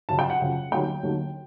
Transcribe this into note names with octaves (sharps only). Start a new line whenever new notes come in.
F#2 C#3 F3 A5
G5
F#5
F#2 C#3 F3
D#2 D3 F#3 A3 G5
D#2 D3 F#3 A3